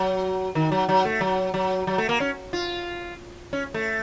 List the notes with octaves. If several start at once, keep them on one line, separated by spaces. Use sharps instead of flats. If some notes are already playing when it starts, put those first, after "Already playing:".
Already playing: F#3
D#3
F#3
F#3
A3
F#3
F#3
F#3
A3
A#3
C#4
F4
C#4
A3